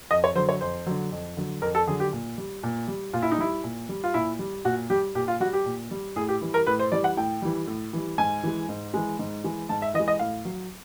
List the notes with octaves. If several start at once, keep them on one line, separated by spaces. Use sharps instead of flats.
F2 D#5
C#5
D3 F#3 C5
C#5
F2 C5
D3 F#3
F2
D3 F#3
F2 A#4
A4
D3 F#3 G#4
G4
A#2
G3
A#2
G3
A#2 F4
E4
D#4
G3 E4
A#2
G3
F4
A#2 E4
G3
A#2 F#4
G3 G4
A#2 G4
F4
G3 F#4
G4
A#2
G3
A2 G#4
G4
E3 G3
A#4
A2 B4
C5
E3 G3 D5
F#5
A2 G5
E3 G3
A2
E3 G3
G#2 G#5
E3 G#3
G#2
E3 G#3
G#2
E3 G#3
G#2 A5
E5
E3 D#5
G#3
D#5
A2 F5
F#3